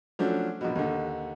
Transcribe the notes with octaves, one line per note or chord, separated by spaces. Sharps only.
F3 F#3 A3 C#4 D4
A#1 B2
D#2 D3